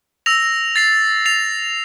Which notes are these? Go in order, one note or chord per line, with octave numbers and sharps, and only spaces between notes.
E6 A#6 F7
A6 C7 F7
A6 C7 F7